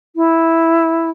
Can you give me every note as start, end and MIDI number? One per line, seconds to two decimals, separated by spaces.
0.15 1.09 64